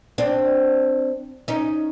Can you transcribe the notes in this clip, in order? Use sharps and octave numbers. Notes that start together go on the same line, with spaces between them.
C4 D4
C#4 D#4